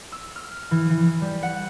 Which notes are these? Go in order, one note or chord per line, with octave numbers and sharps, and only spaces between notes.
E6
F6
E3
E3
G3
F#5